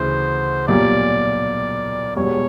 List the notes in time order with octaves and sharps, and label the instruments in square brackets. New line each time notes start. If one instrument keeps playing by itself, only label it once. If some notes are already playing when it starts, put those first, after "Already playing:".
Already playing: [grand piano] D2 C#3 E3 [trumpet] C5
[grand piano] B1 A#2 G3 A#3 [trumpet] D5
[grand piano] E1 E2 B2 G3 [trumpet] C#5